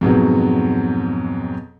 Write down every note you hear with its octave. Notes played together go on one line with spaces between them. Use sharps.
F2 G#2 B2 F#3